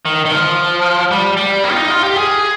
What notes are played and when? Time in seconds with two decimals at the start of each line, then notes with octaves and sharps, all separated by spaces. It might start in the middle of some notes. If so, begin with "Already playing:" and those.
0.05 D#3
0.25 D#3
0.32 F3
1.11 G3
1.37 G3
1.64 A#3
1.72 F4
1.77 D#4
1.90 F4
2.03 G4
2.16 G#4